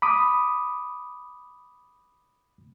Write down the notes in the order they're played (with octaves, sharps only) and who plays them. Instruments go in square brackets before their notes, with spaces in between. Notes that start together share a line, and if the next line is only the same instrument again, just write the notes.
[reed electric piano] B5 D6 D#6